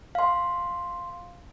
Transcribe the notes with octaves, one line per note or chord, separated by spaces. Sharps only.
F5 C6